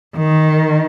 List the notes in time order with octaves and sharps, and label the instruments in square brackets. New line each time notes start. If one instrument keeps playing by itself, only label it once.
[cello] D#3